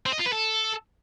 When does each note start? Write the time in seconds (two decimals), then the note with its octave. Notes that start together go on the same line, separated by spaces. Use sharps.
0.06 C4
0.13 D#5
0.19 F4
0.26 B4
0.33 A4